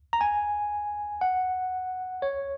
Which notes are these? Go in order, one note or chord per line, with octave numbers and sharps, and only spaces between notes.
A#5
G#5
F#5
C#5